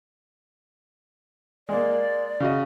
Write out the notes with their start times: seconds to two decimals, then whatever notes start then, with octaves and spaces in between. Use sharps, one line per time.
1.69 G#3 A#3 D5
2.40 C#3 F#4 D#5